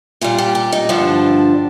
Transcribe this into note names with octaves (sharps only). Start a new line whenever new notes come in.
A#2 G3 F4
G4
G4
D#4
G2 D3 F3 D4